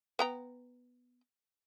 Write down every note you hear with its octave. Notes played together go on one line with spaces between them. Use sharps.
B3 G5 A#5